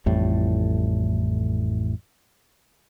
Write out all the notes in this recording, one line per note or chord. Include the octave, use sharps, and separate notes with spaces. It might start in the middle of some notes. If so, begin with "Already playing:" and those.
A1 F2 A2 G3